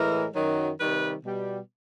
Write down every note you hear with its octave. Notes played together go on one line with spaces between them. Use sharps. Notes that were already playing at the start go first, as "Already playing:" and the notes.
Already playing: A2 E3 G#3 A#4
F#2 D#3 F#3
C3 D#3 G3 B4
B2 G3